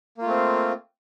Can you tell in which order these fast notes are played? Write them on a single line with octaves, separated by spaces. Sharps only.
A#3 F4 A3 C4